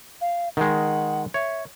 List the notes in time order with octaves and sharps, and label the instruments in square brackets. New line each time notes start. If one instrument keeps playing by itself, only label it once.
[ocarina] F5
[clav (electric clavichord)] D#3 G#3 [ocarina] F#5
[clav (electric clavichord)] C#5 [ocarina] E5